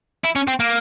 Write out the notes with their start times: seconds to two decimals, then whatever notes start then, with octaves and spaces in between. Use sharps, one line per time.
0.24 E4
0.36 C#4
0.48 C4
0.60 A#3